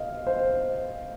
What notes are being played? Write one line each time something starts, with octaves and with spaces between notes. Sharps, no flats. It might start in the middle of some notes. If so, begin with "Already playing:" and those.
Already playing: D#5 F5
C5